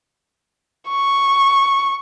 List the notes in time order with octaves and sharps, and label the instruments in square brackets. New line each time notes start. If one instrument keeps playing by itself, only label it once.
[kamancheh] C#6